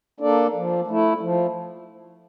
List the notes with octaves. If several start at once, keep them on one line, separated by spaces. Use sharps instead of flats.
A#3 D4 A4 D5
F3
A3 E4
F3